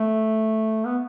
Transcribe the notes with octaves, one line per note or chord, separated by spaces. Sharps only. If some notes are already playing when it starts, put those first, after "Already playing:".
Already playing: A3
B3